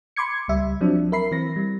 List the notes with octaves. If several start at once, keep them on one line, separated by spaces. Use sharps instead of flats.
B5 C6 D6 G#6 C#7
C#2 G3 E5
F3 F#3 C4 D4
A#4 E5 B5 C7
E3 C4 A#6
G3